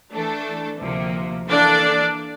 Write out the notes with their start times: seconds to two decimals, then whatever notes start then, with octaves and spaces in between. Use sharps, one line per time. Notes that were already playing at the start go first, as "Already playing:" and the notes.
0.11 E3 A3 D4 A4
0.80 D2 C3 F3 A#3
1.47 E3 A#3 D4 A4 D5